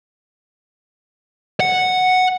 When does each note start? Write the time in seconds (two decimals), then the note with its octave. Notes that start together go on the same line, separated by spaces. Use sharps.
1.60 F#5